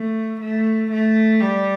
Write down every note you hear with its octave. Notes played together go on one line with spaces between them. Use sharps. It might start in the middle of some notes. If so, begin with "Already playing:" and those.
Already playing: A3
A3
A3
G3